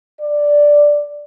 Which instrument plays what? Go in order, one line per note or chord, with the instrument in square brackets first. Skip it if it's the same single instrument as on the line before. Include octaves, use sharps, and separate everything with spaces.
[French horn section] D5